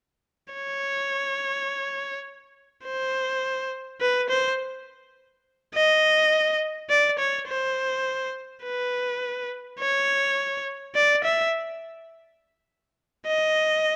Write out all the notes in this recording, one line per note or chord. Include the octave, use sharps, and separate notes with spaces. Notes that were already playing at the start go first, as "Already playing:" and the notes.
C#5
C5
B4
C5
D#5
D5
C#5
C5
B4
C#5
D5
E5
D#5